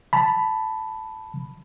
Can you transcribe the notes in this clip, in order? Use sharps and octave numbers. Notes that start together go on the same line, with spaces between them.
A5 B5